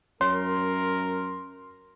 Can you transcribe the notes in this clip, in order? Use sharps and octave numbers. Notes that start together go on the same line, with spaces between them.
F#2 A#4 C#5 C6